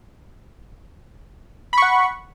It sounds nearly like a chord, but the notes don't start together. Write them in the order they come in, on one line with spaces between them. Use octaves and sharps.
B5 C#6 F#5